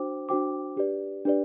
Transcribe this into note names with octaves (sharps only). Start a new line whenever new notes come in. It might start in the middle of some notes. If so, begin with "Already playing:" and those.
Already playing: D4 F#4 C5 G5 D6
D4 F#4 C5 G5 D6
D4 G4 B4 D5
D4 G4 B4 D5